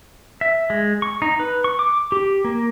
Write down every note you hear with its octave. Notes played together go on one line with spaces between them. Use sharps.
E5
G#3
C#6
D#4
B4
C#6
D6
G4
A#3